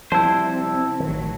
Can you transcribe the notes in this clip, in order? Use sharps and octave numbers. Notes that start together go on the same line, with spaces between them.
C3 F3 G3 E4 G4 C5 A5
A1 D#3 F#3